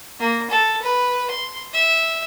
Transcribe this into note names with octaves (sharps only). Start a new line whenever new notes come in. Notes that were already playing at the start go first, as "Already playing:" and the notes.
A#3
A4
B4
C6
E5